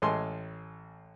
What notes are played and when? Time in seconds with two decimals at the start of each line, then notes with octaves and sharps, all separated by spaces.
0.02 A1 G#3 A4 G#5 C6